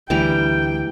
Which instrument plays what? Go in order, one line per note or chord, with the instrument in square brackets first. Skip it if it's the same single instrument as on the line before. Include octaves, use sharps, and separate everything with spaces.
[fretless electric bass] D2 [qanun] E3 G3 A#5 [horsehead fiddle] G5